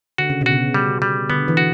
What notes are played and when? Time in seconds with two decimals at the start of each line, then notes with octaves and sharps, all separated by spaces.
0.18 D3 F#4
0.30 C#3
0.41 B2
0.46 F#4
0.52 C#3
0.74 G3
1.02 G3
1.29 D3 B3
1.48 E3
1.57 F#4